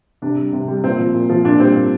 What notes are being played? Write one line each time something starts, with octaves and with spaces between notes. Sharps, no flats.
C3 D4
G3
C3
G3
A#2 C4
F3
A#2
F3
A#2 D4
G3 C4
A#2